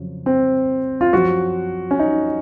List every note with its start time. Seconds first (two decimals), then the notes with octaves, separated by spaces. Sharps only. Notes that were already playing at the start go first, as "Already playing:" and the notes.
Already playing: F2 C#3 F#3
0.26 C4
1.01 F4
1.13 F#2 F3 F#4
1.91 C#4
2.00 D#4